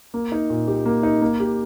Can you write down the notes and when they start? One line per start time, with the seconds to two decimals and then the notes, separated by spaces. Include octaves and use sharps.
0.14 A#3
0.32 D#4
0.50 A#2
0.68 G4
0.86 A#3
1.03 D#4
1.22 A#3
1.40 G4